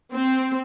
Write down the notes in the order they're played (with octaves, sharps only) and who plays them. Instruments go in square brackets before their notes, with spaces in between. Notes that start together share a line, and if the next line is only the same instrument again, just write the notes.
[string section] C4